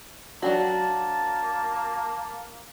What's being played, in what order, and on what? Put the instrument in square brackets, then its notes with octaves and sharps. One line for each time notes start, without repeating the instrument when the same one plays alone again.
[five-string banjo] F#3 D4 F#4 [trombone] A#3 [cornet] A5